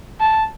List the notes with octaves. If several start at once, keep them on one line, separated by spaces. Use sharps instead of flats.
A5